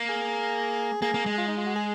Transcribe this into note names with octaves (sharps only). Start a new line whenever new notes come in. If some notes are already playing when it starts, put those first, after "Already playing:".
Already playing: A#3
G#4
A#3 G#4
A#3
G#3
F4
D#4
F4
F#4
G#4